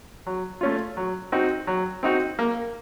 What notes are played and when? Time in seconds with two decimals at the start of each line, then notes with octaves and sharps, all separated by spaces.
0.27 F#3
0.61 A3 C#4 F4
0.97 F#3
1.32 C4 D#4 F#4
1.67 F#3
2.03 C4 D#4 F#4
2.39 A#3